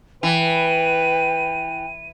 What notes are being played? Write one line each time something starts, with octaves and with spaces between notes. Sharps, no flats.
E3 B4 G5 D#7